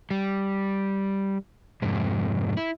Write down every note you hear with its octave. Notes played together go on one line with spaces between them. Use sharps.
G3
F2 G#2 C3
E4